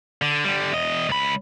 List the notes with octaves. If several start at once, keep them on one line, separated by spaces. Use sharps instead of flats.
D3
D3 G3
E2 D#5
C#2 B5